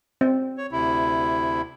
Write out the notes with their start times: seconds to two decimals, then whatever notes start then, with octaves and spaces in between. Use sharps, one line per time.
0.21 C4
0.57 C#5
0.72 D2 C3 E4